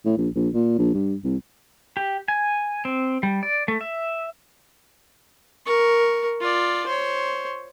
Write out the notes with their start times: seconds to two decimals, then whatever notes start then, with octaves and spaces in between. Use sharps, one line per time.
0.05 A2
0.18 A#1
0.35 A#1
0.54 A#2
0.78 A#1
0.94 G2
1.24 C2
1.97 G4
2.28 G#5
2.85 C4
3.23 G3
3.43 D5
3.68 A3
3.81 E5
5.66 A#4 C#6
6.41 F4 D5
6.87 C5 C#5